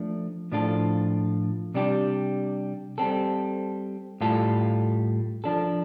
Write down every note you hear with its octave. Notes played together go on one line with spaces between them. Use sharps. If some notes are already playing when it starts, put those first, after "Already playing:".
Already playing: F3 A3 D4
A2 F3 D4 F4 A4
C3 G3 D4 G4
G3 C4 A4
A2 G3 F4 A4
F3 D4 A4